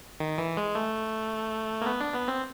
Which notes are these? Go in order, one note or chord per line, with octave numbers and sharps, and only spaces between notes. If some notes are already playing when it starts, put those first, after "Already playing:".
D#3
E3
G#3
A3
A#3
B3
D4
B3
C4